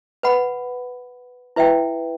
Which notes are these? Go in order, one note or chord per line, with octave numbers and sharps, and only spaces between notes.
B4 F#5 B5
E4 B4 E5 G5